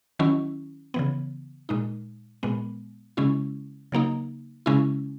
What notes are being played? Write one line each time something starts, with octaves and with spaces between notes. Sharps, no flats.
D#3 F#3 C#4 E4
C#3 E3 B3
A#2 G#3 D#4
A#2 G#3 B3
C#3 G#3 C#4 E4
C#3 F#3 A#3 D#4
C#3 G#3 C#4 E4